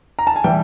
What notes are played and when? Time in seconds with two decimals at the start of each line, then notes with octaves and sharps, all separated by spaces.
0.19 A#5
0.27 A5
0.36 G#5
0.44 E3 G3 G5